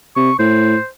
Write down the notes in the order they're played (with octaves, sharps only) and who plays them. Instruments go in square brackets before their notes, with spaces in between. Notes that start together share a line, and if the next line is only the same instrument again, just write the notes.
[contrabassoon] C3 [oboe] C#6
[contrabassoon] A2 [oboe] C5